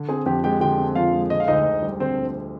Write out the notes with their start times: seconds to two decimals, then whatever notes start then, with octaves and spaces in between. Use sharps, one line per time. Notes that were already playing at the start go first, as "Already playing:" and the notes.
Already playing: D3
0.09 C4 G#4 G#5
0.26 F2 G4 G5
0.44 G#3 G4 G5
0.61 D3 G4 G5
0.78 C4
0.95 F2 F4 F5
1.14 G#3
1.30 D3 D#5
1.40 F5
1.48 D2 D#4 D#5
1.65 D2
1.82 G3
1.99 D3 C4 C5
2.18 D2